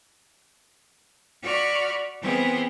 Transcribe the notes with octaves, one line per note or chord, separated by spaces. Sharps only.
F#4 D5 B5 C#6 F6
E3 B3 C4 G#4 A#4 C5